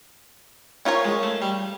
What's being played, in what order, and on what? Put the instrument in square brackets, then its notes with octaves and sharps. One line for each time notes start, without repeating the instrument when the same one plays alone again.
[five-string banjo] C#4 F4 A#4 C#5
[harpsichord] G#3
A3
G3